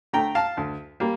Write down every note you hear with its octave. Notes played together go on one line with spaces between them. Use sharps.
D3 A3 G5 A#5
F5 A5
D2
G3 A#3